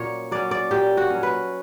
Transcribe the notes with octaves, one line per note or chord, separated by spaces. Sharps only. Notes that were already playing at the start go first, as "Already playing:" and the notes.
Already playing: A#2 F#3 C#4 C#5
F#3 C#4 D5
D5
A#2 G4
F#4
F#3 C#4
B4